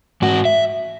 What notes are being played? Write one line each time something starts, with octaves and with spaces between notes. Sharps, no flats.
G#2 F#4
E5